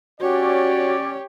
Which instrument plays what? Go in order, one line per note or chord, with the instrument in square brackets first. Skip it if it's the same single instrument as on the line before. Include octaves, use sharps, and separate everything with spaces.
[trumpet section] C#4 D5 [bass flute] F#4 [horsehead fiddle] G4 C#5